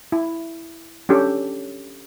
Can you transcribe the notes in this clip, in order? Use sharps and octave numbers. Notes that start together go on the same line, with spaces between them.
E4
C#4 D4 G4 A4